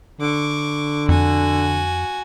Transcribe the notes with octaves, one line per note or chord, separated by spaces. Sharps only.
D3 C#6 D6
F2 F#4 G#5